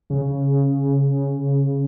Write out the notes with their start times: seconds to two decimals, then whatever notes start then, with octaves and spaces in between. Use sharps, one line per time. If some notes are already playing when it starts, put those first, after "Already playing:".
0.10 C#3